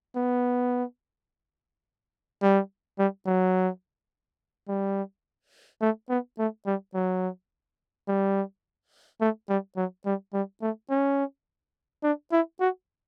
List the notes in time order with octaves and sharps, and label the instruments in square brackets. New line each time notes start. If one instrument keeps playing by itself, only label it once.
[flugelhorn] B3
G3
G3
F#3
G3
A3
B3
A3
G3
F#3
G3
A3
G3
F#3
G3
G3
A3
C#4
D4
E4
F#4